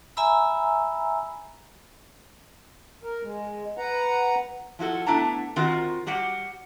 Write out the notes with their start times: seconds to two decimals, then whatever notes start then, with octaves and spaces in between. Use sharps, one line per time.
0.17 E5 G#5 A#5 B5 E6
3.03 A#4
3.23 G#3
3.78 B4 F#5 A#5
4.79 F3 E4 F#4 A4
5.06 A3 B3 D4 E4 A5 A#5
5.56 D#3 C4 F4 F#4 A#4
6.06 G3 F#4 G4 F#5